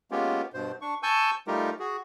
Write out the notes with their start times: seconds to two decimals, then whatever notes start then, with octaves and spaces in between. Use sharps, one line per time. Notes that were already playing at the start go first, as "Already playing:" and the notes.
0.11 G#3 A#3 B3 C#4 F4 G4
0.54 G2 B2 C5
0.81 D4 C#6
1.03 G#5 A5 C#6 E6 G6
1.47 G3 A3 D#4 F4 G4 A#4
1.79 F#4 G#4